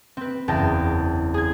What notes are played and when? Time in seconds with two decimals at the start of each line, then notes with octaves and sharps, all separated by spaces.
0.17 C4 B4
0.48 F#1 E2 G5 A5 A#6
1.34 G#4 G#6